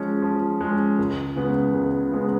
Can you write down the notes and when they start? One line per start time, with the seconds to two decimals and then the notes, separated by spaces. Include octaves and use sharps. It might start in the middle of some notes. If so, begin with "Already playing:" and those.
Already playing: F3 G#3 C#4
0.22 F3
0.61 G#3 C#4
0.99 C#2
1.36 C#3 G#3 B3
1.74 C#2
2.12 C#3 G#3 B3